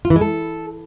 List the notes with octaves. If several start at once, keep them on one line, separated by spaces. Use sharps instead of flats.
F4
E3
G#3
A4